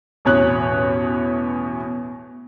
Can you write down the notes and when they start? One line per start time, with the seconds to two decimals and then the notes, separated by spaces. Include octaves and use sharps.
0.25 A1 E2 B2 C#4 C#5 F#6